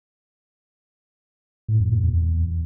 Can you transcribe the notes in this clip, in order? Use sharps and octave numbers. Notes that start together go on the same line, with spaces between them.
A2
F2
A#2
E2